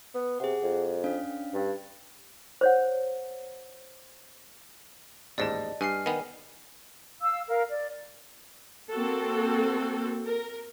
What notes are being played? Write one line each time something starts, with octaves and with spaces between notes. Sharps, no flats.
B3
C3 G#4 F#5
F2
C#4 D4 F5
G2
C5 C#5 F#5
A1 D#2 G#2 D5 D#5 A5
G2 G#5 F6 C7
D#3 B3 G#5
F5 E6
A#4 F5
D5
A#3 C4 F#4 A4
A#4